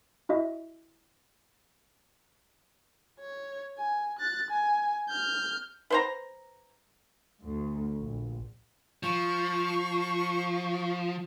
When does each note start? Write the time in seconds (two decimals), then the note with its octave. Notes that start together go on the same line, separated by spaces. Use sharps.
0.29 E4 F#4 D#5 E5
3.20 C#5
3.77 G#5
4.19 F#6 A6
4.50 G#5
5.09 F6 G6
5.90 B4 C5 A#5
7.42 D2
7.97 A#1
9.03 F3 C#6